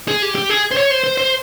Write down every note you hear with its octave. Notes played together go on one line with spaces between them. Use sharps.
G#4
G4
G4
G#4
C5
C#5
C5
C5
C5